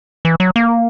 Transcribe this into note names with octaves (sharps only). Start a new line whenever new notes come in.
E3
F#3
A#3